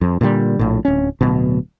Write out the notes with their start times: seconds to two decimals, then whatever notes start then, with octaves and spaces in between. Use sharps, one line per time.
0.01 F2
0.21 A#2 D3 F#3 G3
0.59 A#1 A2
0.85 D1 C#4
1.21 D1 B2